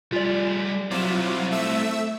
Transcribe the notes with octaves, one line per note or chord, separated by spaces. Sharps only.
G3 F4 G#4 D5
F#3 C4 E4 F4 D6 E7
A3 E5 E6